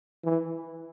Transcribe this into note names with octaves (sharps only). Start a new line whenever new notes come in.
E3